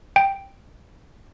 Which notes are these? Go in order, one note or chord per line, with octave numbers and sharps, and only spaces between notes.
G5